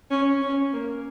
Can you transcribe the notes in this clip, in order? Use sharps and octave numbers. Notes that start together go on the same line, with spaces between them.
C#4
C#4
A#3